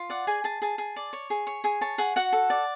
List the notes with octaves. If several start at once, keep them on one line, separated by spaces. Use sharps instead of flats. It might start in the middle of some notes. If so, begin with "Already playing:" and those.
Already playing: F4
D5 F#5
G#4 G#5
G#4 A5
G#4 A5
G#4
D5
C#5
G#4
C#5
G#4 G#5
C#5 A5
G#4 F#5
F#4 F#5
A4
D5